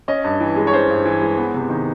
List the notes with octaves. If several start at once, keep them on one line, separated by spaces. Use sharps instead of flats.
C#4 D#5
G2
E3
G#3
C#5
C#4 C5
G2
E3
G#3
B3
C3
D#3